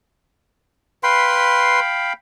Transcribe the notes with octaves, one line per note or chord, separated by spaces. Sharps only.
B4 F5 G5 B5 C6